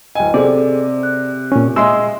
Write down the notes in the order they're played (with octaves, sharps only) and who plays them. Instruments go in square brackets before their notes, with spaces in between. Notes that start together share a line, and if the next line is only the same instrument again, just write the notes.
[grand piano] D1 G#5 [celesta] D#5 G5
[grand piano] C3 [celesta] G#4 A4 C5 [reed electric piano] D5
[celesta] F#6
[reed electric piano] A#2 C#4
[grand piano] G#3 [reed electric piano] D#5 C6 E6 [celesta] E5